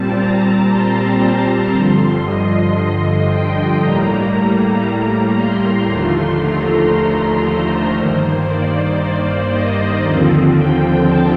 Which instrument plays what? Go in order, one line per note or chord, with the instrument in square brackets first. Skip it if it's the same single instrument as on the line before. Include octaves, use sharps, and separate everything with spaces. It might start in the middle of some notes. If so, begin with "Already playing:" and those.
Already playing: [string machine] A#2 G3 C4 A5
A#5
C6
G2 D3 F3 C6
D#5
D#5
G5
A2 G3 A#3 A#5
A#5
C6
D#2 D3 F3 A3
A#5
C5
G2 D#3 A#3
D5
C5
D#5
D#2 D3 F3 C4
G5
A5